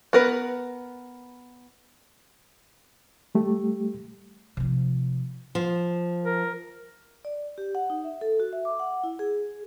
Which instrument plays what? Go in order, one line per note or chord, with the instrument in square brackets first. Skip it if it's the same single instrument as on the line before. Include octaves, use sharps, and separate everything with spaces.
[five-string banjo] B3 A#4 B4
[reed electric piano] G3 A3 G4
[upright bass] C3 F3
[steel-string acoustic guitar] F3
[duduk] A#4
[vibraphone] D5
G4
F#5
D#4
E5
A4
F#4
E5
D6
F#5
E4
G#4